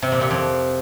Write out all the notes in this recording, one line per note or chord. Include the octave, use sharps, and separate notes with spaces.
C3
A#2
C3
F2